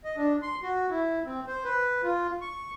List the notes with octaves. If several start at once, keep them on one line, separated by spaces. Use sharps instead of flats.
D#5
D4
C6
F#4
E4
C4
C5
B4
F4
C#6